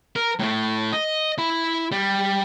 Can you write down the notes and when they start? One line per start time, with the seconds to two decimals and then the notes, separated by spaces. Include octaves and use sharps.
0.16 A#4
0.39 A2 A3
0.92 D#5
1.38 E4 B5
1.92 G3